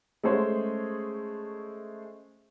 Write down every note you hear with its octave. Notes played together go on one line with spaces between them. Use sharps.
G#3 A3 C#4 G#4 C5 C#5